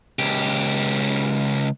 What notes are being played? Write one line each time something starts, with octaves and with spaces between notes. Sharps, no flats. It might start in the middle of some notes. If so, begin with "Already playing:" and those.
C#2 G4